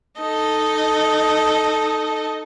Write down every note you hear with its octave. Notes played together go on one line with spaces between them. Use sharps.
D#4 A4 D#5